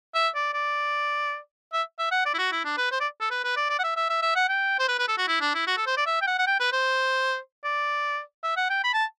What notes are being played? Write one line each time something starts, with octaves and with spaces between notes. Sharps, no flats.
E5
D5
D5
E5
E5
F#5
D5
E4
F#4
E4
D4
B4
C5
D5
A4
B4
B4
D5
D5
F#5
E5
E5
E5
E5
F#5
G5
C5
B4
B4
A4
F#4
E4
D4
E4
F#4
A4
C5
D5
E5
G5
F#5
F#5
G5
B4
C5
D5
E5
F#5
G5
B5
A5